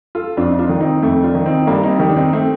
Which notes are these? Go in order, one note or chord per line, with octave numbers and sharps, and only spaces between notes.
F4 A4
F2 D4 F4
D#4
D4 F4
D#3
C4 D#4
F2 A3 C4
D4 F4
D#3
C4 D#4
G2 A#3 D4
C4 D#4
D#3 D#4 G4
D4
C4 D#4
A3 C4